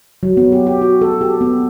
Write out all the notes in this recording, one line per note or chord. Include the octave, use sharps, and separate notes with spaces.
F#3
B3
G4
G4
F#4
A4
G4
B3